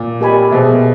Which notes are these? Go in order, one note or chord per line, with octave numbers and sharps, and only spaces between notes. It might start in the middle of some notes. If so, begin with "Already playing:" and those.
Already playing: A#2
G4 A#4 D#5 G#5 B5
B2 G#4 C5 E5